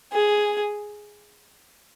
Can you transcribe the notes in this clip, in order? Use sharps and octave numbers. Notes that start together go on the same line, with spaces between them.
G#4